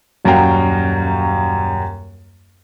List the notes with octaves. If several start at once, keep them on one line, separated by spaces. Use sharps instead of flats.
D#1 F#2 F#4 F5 G5 A#5